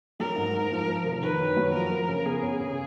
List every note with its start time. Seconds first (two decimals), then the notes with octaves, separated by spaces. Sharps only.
0.20 F#3 A#4
0.36 G#2
0.54 G#2
0.71 F3
0.88 F3
1.05 F1
1.22 D#3 B4
1.40 F#2
1.57 F#3
1.74 F3 A#4
1.92 F3
2.09 C#3
2.25 B3 G#4
2.42 C#3
2.60 C#3